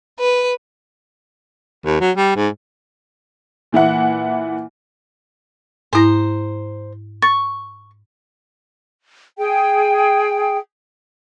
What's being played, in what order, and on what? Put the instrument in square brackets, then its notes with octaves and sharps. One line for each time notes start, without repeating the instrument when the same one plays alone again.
[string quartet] B4
[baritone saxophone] D#2
F#3
G3
G#2
[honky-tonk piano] A#2 E3 E4 F#5
[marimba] G#2 E4 A#6 [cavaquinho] C5 A#5
[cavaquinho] C#6 [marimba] A6
[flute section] G#4 G5